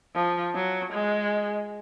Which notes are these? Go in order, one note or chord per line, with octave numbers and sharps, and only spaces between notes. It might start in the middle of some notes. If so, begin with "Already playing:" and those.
F3
F#3
G#3